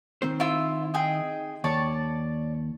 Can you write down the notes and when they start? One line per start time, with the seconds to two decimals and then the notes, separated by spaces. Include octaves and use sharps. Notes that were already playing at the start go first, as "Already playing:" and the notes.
0.22 D#3 C4 C5
0.40 E4 F4 E6
0.94 D#4 G#4 G5
1.64 D#2 C#5 D5 A5